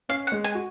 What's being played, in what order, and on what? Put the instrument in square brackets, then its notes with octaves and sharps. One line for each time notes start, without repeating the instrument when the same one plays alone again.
[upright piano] C#4 [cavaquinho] F5
[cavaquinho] F#5
[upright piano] G#3
[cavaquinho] G#5
[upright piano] F#4